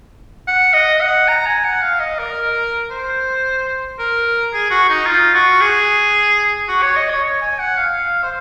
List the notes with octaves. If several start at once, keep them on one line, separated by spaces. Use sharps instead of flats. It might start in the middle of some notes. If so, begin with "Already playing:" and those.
F#5
D#5
F#5
A#5
G#5
F#5
F5
D#5
A#4
C5
A#4
G#4
F#4
D#4
F4
F#4
G#4
F#4
C#5
D#5
C#5
C#5
G#5
F#5
F5
C5